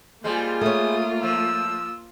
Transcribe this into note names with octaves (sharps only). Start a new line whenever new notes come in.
G3 G#3 A#3 F4 C5
A3 C#5 D#6
F3 E6